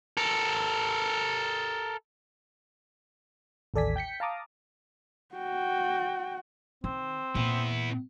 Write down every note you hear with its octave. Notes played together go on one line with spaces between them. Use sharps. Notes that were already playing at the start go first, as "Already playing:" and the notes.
A4 A#4
A1 D#2 A4 D5 G#5 B6
G5 G6 B6 C#7
F5 A5 A#5 D6 D#6
F#4 G5
D#3 C4
A#2 B3 E4